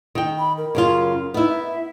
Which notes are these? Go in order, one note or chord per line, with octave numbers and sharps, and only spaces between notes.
D#3 G5
B5
A#4
F#2 C#3 F4
B3 D#4 E4
E5